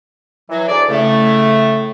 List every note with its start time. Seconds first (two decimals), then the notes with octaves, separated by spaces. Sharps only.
0.50 E3 F#3
0.68 D2 D4 G#4 D5
0.89 A2 C#3 A3